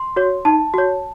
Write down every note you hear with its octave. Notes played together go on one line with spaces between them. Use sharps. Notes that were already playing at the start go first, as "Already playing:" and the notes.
Already playing: C6
F#4 C#5
D#4 A5
F#4 C#5